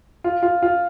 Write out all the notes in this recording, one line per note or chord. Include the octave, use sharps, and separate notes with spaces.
F4
F4
F4